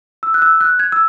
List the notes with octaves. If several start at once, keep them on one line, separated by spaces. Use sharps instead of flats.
E6
F#6
E6
F#6
G#6
E6